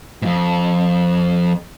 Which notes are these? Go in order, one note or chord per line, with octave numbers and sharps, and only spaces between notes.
F2 G#2